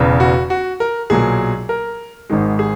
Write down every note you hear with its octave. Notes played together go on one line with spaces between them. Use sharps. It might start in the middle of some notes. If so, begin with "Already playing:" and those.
Already playing: E1 E2 C#3
F#4
F#4
A#4
B1 A#2 F#3 G#4
A#4
G#1 G#2 D#3 G#3
G#4